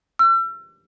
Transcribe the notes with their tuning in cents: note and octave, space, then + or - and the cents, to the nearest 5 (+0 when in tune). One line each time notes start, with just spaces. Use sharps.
E6 +40